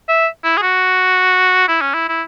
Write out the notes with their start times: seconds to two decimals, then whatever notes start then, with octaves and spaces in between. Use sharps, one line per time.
0.09 E5
0.44 E4
0.57 G#4
0.62 F#4
1.68 E4
1.81 C#4
1.94 E4
2.08 E4